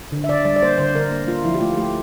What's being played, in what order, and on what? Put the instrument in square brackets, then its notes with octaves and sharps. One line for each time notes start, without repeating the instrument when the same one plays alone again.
[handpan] D3
E5
D3 D5
G3 D5
D5
A#3 C5
D3 C5
D3 A#4
A#3
A#3 F4
F3 E4
G4
A3 F4
A3 G4